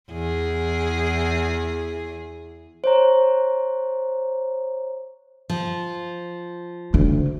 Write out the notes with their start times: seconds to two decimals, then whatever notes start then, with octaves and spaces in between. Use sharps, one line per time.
0.10 E2 G#4
2.84 C5 C#5 A#5
5.50 F3
6.94 D2 C#3